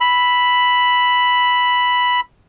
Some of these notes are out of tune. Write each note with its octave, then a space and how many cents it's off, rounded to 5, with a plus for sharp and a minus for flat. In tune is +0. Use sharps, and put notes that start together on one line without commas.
B5 +0 E6 +0